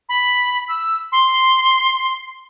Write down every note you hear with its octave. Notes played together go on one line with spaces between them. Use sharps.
B5
E6
C6